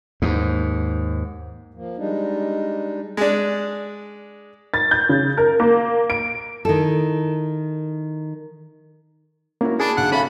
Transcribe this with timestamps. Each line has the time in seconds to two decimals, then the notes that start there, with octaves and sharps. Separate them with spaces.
0.22 D#2 G#2
1.74 F3 A#3
1.97 G3 G#3 D4 D#4
3.17 G#3 D4
4.74 A6
4.91 G6
5.09 C#3
5.37 A#4
5.60 A#3
6.10 D7
6.65 D#3 E4 A4
9.61 A#3 C#4 E4 F#4
9.80 D4 G#4 A5 B5
9.97 B1 D3 F#5
10.12 C#4 A4 E5 F5 B5